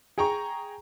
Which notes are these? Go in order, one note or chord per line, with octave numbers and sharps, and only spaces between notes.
G#4 G5 A#5 C#6